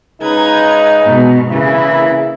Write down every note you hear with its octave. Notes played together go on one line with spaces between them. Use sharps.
C#3 G#3 D#4 B4 A#5 G#6
G#2 B2
C#3 E3 A#3 E4